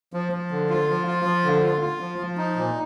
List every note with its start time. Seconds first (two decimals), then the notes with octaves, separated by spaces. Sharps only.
0.13 F3
0.32 F3
0.51 D3
0.69 F4
0.89 F3
1.07 F4
1.25 F3
1.44 D3
1.63 F4
1.82 F4
2.00 F3
2.18 F3
2.37 D#4
2.56 A#2